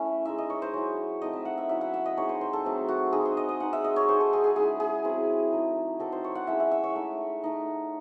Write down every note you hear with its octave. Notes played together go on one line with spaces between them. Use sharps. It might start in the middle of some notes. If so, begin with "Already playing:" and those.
Already playing: A3 C#4 E4 E5
G#3 D#4 E5
D#5
C#5
C5
F#3 C#4 E4 C#5
A3 C4 D#4 D#5
E5
F#5
E5
F#3 C#4 E4 E5
F#5
E5
D#5
G#3 C4 D#4 C#5
C5
C5
A4
F#3 A3 C4
F#4
G#3 D#4 G#4
C5
D#5
D#5
G#3 D#4 F#5
E5
D#5
C#5
G#3 D#4 C5
A4
G#4
G#4
G#3 C#4 E4 G#4
G#4
F#3 C4 E4
A3 D#4
F#3 C4 D#4 A4
C5
C#5
F#5
G#3 C#4 E4 E5
E5
E5
C#5
A3 D#4
A3 D#4